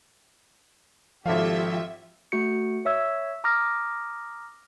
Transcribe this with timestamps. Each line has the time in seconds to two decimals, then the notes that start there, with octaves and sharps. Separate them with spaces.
1.26 G#1 F3 F4 G4 A4 E5 F5
2.32 A3 F#4 C#7
2.85 C#5 E5 E6 G#6
3.44 A#5 D6 D#6 F6 A#6